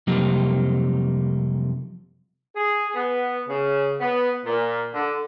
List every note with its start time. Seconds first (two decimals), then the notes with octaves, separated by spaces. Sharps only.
0.07 F2 C3 F#3 G3 A#3 D#4
2.55 G#4
2.95 B3
3.48 C#3
4.00 B3
4.45 A#2
4.94 D3